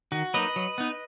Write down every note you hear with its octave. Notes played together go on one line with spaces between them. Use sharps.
D#3 F#4
F#3 A#3 D#4 B4 D#5
F#3
B3 D#4